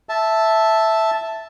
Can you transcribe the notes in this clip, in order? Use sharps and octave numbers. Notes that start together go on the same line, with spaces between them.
E5 A5